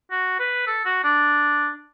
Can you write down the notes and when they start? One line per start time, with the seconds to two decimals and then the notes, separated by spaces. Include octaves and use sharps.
0.11 F#4
0.39 B4
0.67 A4
0.85 F#4
1.04 D4